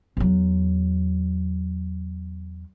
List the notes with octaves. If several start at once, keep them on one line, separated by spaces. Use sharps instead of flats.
E2 F#3